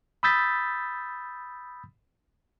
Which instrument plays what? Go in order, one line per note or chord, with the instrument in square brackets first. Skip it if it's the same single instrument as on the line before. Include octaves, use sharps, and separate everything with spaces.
[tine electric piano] B5 D#6 E6 G6 A6 B6